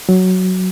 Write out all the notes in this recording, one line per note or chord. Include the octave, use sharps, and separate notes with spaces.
F#3